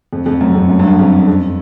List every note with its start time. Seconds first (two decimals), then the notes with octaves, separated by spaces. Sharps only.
0.13 F2
0.26 F2
0.41 F#2
0.55 F2
0.69 F#2
0.79 G2
0.88 F#2
0.99 F2
1.27 F2